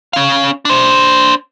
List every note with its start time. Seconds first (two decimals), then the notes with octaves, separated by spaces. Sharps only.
0.13 C#4 F5
0.65 D4 C5